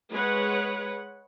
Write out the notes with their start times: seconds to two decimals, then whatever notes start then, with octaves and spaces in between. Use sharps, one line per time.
0.11 G#3 G#4 B4 C#5 F#5